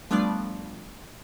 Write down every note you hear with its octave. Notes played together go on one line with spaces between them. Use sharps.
F3 G3 A3 B3 D4 D5